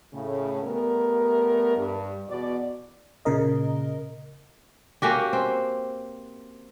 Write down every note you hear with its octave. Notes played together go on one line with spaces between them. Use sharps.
A2 C#3
G3 A3 B3 A#4
G2
E2 B2 F#4 D5
A#2 C#3 A#4 D#5
A#3 C#4 F#4 G4
C4